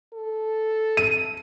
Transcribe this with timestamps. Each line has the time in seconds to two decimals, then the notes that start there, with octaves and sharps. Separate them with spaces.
0.14 A4
0.97 D#7